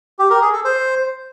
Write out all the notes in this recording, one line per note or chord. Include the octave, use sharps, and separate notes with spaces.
G4
A#4
G#4
A4
C5